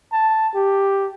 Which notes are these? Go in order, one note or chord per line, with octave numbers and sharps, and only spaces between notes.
A5
G4